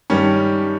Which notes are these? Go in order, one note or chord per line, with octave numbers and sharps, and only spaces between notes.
G2 D#3 G3 C#4 G4